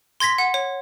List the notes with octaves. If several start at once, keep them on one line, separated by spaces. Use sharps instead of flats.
C6 G#6 A#6 B6
F#5
C#5